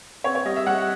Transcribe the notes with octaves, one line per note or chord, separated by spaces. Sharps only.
C4 C#5
C#5
G3 D#5
E5
G3 F#5